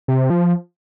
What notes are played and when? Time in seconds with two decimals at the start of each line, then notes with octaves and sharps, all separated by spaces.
0.08 C3
0.30 F3